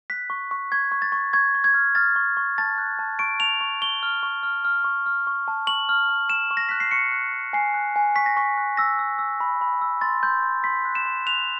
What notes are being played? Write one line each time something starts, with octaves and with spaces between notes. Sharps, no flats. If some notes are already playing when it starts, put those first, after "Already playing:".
F#6 B6
C#6
C#6
C#6 G#6
C#6
A6
C#6
C#6 G#6
C#6
G#6
F6
F6 A6
C#6
C#6
A5 A6
F#6
A5
C#6 D7
A5 F7
C#6
C#6 G7
F6
C#6
F6
F6
C#6
F6
C#6
A5
C#6 F#7
F6
A5
C#6 E7
C#6
A#6
F#6 B6
C7
C#6 C#7
F#6
C#6
G#5 C7
F#6
G#5
C#6 B6
A#6
C#6 B6
F#6
E6 A#6
E6
E6
B5
B5
E6
C6 A6
C6 G6
C6
C6 B6
F#6
E7
C6
F#6 F7